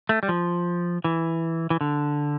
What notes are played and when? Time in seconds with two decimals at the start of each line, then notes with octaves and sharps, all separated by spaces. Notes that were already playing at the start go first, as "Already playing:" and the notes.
0.09 A3
0.23 G3
0.29 F3
1.04 E3
1.70 E3
1.81 D3